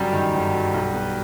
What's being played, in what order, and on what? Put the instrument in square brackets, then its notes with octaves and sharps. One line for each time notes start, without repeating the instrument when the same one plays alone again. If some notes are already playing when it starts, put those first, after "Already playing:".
Already playing: [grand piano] G1 F#2 F#3 [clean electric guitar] G3
[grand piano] D#3
G1
F#3
B1
B3